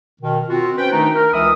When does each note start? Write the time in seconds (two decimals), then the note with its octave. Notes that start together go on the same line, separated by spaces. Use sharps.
0.21 B2 D#3
0.49 C4 F4 F#4
0.77 C#4 B4 C5 G5
0.92 D#3 A3 D4 D#4
1.15 A#4
1.33 C#2 E3 E5 B5 D#6